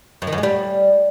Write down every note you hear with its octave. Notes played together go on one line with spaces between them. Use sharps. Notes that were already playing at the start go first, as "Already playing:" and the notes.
F#2
D#3
F#2
G#3
G3